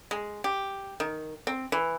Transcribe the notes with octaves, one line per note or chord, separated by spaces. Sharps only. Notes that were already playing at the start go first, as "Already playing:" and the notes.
G#3
G4
D#3
C4
E3